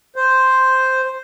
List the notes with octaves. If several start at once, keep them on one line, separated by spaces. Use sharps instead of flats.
C5